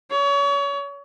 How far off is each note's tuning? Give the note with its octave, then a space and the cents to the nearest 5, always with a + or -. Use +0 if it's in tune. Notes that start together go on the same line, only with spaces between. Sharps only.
C#5 +30